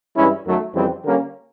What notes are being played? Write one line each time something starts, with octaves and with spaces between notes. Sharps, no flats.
G2 E3 G#3 C#4 E4
F#2 D#3 F#3 A3
F2 C#3 E3 G3 C4
D3 G3 A#3 C#4